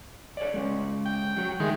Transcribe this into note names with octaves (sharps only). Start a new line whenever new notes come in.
A4 C#5 D5
G#3 C#4
G5
F#3 F#4
D#3 G#3 A3